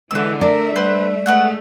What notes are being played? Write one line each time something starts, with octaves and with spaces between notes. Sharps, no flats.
D3 E3 G#3 F#4 E6
A3 D4 A#4 D5 E5
G3 B4 C5 F#5
G#3 A3 B3 F#4 F#5